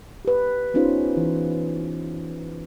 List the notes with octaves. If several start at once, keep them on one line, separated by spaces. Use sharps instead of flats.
G4 B4
B3 C#4 D#4 F4 G4 C5
E3